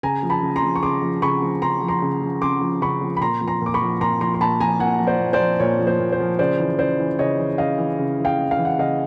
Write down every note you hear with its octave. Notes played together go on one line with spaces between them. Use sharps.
C#3 G#5 A#5
F3
A5 B5
C#3
A#5 C6
F3
C#6
C#3 C6 D6
F3
C#3 B5 C#6
F3
C#3 A#5 C6
F3
A#5 C6
C#3
F3
C#3 C6 D6
F3
C#3 B5 C#6
F3
B5
A#2 A#5 C6
F3
A#5 C6
A#2 D6
B5 C#6
F3
A#2 A#5 C6
F3 A#5 C6
C6
A#2 A5 B5
F3 G#5 A#5
A#2 F#5 G#5
F3
C5 D5
A#2
C5 D5
F3
A#2 C#5
F3
C5
A#2
C5
F3
C#3 C5 D5
E3
C#3 C5 D5
E3
C#3 C#5 D#5
E3
C#3 D#5 F5
E3
C#3
E3
F5 G5
C#3
F5
E3
F#5
C#3 D#5 F5